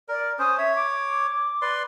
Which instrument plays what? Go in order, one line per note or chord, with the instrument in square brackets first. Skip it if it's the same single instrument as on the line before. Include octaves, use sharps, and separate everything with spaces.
[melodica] A#4 [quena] D5
[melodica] C#4 C5 [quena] D#6
[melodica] C#5 [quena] E5
[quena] D6
[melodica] B4 D5 C6